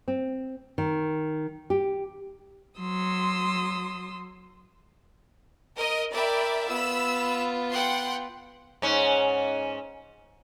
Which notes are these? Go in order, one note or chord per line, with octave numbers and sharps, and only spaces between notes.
C4
D#3
G4
F#3 C6 D#6 E6
A#4 D#5
A#4 D5 E5 G5 B5
B3 F4 B5 E6
F#5 G5 C6
G#2 C#4